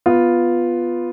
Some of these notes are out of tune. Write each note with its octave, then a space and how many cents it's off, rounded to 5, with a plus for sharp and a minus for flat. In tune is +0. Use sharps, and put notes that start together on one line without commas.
B3 +0 F4 +0